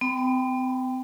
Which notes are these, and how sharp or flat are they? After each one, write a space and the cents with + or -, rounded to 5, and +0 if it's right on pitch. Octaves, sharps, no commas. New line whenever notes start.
C4 -40 G5 +0 B5 +0